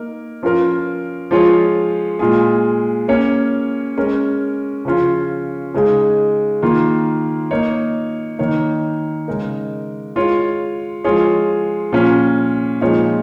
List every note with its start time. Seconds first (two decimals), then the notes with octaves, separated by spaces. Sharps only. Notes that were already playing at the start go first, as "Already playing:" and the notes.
Already playing: A#3 D#4 A#4
0.43 F3 C#4 F4 A#4
1.31 F3 G#3 F4 G#4 C#5
2.19 A#2 G#3 F4 G#4
3.08 A#3 C#4 A#4 C#5
3.97 G#3 C#4 A#4 C#5
4.85 C#3 F3 C#4 F4
5.74 C#3 G#3 D#4 G#4
6.62 D#3 A#3 F4
7.51 A#3 D#4 C#5
8.39 D#3 A#3 D#4 C#5
9.28 C#3 G#3 D#4 A#4
10.16 G#3 F4 C#5
11.04 F3 G#3 F4 G#4 C#5
11.92 A#2 F3 C#4
12.81 A#2 F3 G#3 D#4 C#5